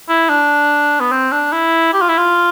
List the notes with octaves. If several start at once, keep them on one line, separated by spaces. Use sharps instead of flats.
E4
D4
B3
C4
D4
E4
G4
F4
E4
F4